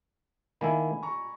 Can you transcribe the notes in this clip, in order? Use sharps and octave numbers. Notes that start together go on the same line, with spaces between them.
D#3 A#3 E4 G#5 B5
A#5 C#6